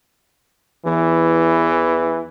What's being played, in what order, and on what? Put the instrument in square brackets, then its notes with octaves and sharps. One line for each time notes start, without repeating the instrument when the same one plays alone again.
[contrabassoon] E2 [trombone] E3